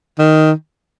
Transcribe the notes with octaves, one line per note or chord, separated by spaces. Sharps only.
D#3